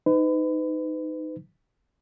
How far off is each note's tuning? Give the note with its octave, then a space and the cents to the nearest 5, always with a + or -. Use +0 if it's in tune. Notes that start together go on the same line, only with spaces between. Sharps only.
D#4 +0 B4 +35